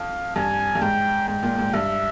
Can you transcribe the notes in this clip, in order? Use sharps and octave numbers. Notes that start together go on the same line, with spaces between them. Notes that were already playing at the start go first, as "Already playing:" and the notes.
Already playing: F2 F5
G2 G#5
G2
G#2 G5
G#2 G5
A#2
G#2
G2 E5